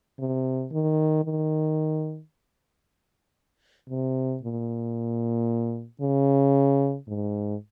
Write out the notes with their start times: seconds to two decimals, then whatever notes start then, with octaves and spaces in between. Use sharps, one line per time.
0.19 C3
0.72 D#3
1.25 D#3
3.89 C3
4.43 A#2
6.01 C#3
7.08 G#2